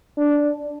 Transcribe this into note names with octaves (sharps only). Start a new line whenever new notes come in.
D4